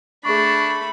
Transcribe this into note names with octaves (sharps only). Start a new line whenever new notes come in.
A3 D4 G#4 B5 C#6